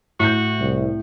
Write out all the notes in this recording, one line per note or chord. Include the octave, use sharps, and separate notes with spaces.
A2 F#4 G6
C2